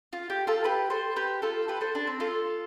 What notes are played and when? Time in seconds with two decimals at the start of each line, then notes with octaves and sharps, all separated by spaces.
0.13 F4
0.30 G4
0.47 F4 A4
0.64 G4 B4
0.90 A4 C5
1.16 G4 B4
1.42 F4 A4
1.68 G4 B4
1.81 A4 C5
1.95 D4
2.07 C4
2.20 F4 A4